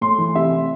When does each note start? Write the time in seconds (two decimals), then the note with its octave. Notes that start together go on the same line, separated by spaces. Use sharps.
0.01 A2 C6
0.18 E3
0.35 C3 E5